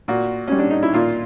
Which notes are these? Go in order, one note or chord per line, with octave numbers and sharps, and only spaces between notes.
A#2 F#4
G3 C#4
D4
D#4
E4
A#2 F4